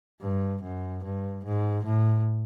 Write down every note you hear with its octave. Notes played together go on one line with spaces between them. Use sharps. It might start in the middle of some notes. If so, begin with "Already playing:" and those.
G2
F#2
G2
G#2
A2